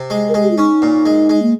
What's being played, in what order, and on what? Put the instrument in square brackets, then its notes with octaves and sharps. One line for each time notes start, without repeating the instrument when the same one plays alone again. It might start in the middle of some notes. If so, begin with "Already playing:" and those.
Already playing: [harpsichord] C3
G#3
[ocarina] A#4
[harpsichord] G#3 [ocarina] G#4
[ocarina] G4
F4
[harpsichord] C#4 [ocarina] D#4
[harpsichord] A#2
G#3
G#3
[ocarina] A#3